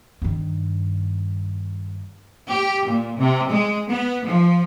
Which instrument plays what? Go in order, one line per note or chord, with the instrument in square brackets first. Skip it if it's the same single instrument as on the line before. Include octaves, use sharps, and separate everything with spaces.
[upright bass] G2 D#3
[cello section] G4
A#2
C3
G#3
B3
F3